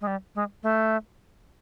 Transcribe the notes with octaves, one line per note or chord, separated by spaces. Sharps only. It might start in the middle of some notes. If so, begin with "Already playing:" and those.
G#3
G3
G#3
A3